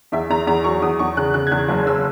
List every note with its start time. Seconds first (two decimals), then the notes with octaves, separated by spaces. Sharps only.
0.12 E2 E5
0.30 E2 A#5
0.47 E2 A#5
0.64 F#3 C#6
0.82 E2 D#6
0.99 E2 C#6
1.17 C#3 F#6
1.34 C#3 F#6
1.47 G#6
1.51 E2 F#6
1.68 F#1
1.86 C#3 E6